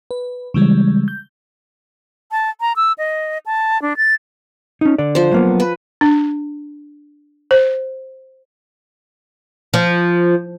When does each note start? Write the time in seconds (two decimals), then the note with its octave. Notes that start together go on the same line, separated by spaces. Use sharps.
0.11 B4
0.54 C#3 E3 G3 G#3
1.08 G6
2.32 A5
2.61 A#5
2.76 E6
2.98 D#5
3.46 A5
3.82 D4
3.97 A6
4.81 C#4 D#4
4.98 D3 D5
5.15 F3 C5
5.32 F#3 A#3 B3
5.60 B4
6.01 D4
7.51 C5
9.74 F3